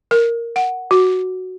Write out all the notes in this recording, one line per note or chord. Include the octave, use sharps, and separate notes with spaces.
A#4
F#5
F#4